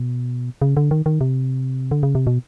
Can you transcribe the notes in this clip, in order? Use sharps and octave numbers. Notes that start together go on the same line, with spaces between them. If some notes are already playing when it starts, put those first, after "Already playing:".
Already playing: B2
C#3
D3
D#3
D#3
C3
D3
C#3
C3
B2